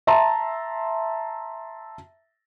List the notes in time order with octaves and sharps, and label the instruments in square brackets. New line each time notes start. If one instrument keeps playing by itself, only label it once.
[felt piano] E5 A5 A#5 C6